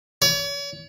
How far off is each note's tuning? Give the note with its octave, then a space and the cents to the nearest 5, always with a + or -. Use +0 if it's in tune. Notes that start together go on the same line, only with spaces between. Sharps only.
C#5 +40